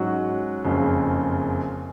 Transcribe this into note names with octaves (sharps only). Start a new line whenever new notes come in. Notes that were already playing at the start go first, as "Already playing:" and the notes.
Already playing: G#2 F#3 C#4 F#4
F#1 F2 C#3